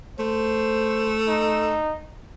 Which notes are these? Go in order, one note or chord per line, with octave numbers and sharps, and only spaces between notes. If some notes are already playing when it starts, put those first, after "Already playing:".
A3 C5
D#4